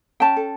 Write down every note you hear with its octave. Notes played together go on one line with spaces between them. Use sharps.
C#4 G5 A5
A4